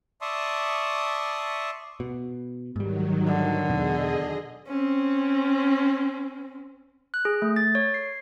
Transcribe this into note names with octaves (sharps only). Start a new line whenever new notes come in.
D5 E5 A5 C6 C#6 D#6
B2
G#2 D#3 F#3 G3
D3
E2 B2 G#4 D#5
C4 C#4
F#6
G#4
A3
A6
C#5
C7